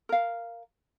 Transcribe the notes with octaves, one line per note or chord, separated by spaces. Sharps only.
A#4 F5